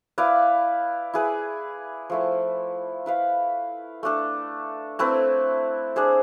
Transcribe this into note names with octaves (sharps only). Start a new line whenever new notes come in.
E4 B4 D5 F5
E4 G#4 B4
F3 A3 E4
E4 B4 F5
A3 D4 A4
A3 C4 E4 B4
D4 G#4 C5